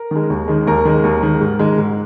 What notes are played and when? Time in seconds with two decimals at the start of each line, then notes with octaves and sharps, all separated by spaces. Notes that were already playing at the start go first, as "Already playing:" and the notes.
Already playing: A#4
0.11 D#3 G#3
0.30 D#2
0.48 D#3 G#3
0.67 D#2 A#4
0.85 D#3 G#3
1.04 D#2
1.23 D#3 G#3
1.41 G#2
1.59 D#3 G#3
1.78 G#2